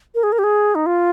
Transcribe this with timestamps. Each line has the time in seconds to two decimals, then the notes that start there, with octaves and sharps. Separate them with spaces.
0.15 A#4
0.23 G#4
0.32 A#4
0.39 G4
0.44 G#4
0.75 D#4
0.86 F4